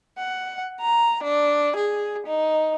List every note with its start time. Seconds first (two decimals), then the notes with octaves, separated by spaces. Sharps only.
0.18 F#5
0.81 A#5
1.23 D4
1.76 G#4
2.27 D#4